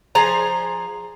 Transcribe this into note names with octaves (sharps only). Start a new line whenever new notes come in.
F3 G#4 C5 A#5